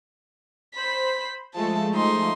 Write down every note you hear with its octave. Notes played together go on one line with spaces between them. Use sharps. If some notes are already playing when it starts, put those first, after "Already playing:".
C5 B5 B6
F3 G#3 A3 A4 A5
D#4 C6